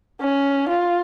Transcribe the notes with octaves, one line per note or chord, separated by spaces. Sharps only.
C#4
F4